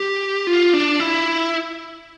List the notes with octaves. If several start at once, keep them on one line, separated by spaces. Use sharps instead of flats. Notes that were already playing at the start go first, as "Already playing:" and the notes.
Already playing: G4
F4
D4
E4